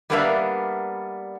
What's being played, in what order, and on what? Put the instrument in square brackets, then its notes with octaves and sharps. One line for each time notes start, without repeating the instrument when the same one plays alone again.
[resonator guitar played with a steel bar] G3 A#3 B3 D4 A#4 E5